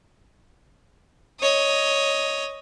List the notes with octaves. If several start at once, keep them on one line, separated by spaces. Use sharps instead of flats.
C#5 D#5